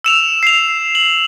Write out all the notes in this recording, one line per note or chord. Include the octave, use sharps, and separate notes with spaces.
E6 E7 F7
C7 F7
F#7